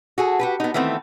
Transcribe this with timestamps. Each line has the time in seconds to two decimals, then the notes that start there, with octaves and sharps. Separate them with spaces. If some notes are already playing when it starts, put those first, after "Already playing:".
0.18 F#4 G#4 A4
0.39 F#4 G4 B4
0.60 B3 D#4
0.74 D#3 E3 A3 B3 C4